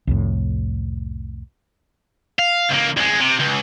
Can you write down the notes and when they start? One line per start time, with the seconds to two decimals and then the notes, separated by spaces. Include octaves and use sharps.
0.07 C2 F2 A2
2.39 F5
2.70 C#2 A#3
2.97 C2 G#3
3.20 C3
3.39 C#2